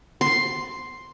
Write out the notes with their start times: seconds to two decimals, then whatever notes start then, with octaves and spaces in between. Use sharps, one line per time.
0.21 C6